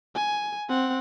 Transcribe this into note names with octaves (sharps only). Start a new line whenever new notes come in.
G#5
C4 F#5